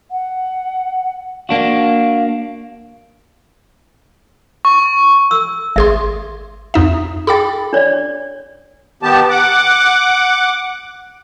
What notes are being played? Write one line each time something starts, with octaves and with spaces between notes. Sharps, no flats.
F#5
A#3 D4 F#4 F5
C#6
E6
G#1 G#4 E5 C6
F2 D#4 E5
G#4 G5 B5 D6 A6
D4 C#5 D5
D#3 B3 G4 A5
F#5 D6